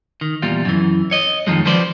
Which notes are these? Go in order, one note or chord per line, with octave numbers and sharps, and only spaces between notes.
D#3
E2 A#2 G3 F4
F#2 E3
C#5 D#5
F2 G#2 D#3 F3 G#3
F3 B4 C5 D5